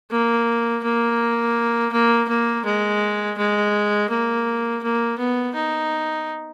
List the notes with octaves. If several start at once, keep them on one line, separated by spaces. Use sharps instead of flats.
A#3
A#3
A#3
A#3
G#3
G#3
A#3
A#3
B3
D#4